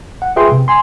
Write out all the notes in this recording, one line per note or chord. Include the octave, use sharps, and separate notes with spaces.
F#5
F4 G#4 B4 E5 G5 C6
C3
G#5 C6